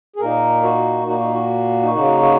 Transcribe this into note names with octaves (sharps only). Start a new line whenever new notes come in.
G#4
A#2 A#3 D#4 A#4
F#4
A#2 A#3 D#4 F#4
D#4
F#4
D#4
C#3 A#3 D#4 F#4
F#4